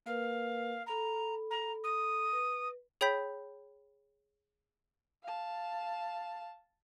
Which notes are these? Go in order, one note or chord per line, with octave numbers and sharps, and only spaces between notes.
A#3 A#4 B4 F5
A4 A#5 B5
A#5
D#6
B4
G#4 C#5 G5 B5 G6 B6
F5 A5